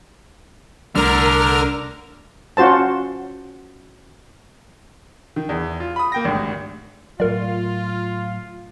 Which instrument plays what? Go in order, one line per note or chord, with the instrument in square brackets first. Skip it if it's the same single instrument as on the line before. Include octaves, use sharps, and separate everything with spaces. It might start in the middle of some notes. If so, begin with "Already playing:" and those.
[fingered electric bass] C2 G3 A3 [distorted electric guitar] D3 [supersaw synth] A#4 F6
[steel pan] C#4 F4 F#4 C5 A5
[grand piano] D#3
E2
F4
B5 D#6
A#3 G5 A#6
G#1 D2 G2
[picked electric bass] A2 F#3 [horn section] F4 [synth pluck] A#4 D5